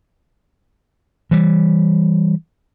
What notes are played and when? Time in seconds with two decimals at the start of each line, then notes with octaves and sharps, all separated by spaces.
1.31 E3 G3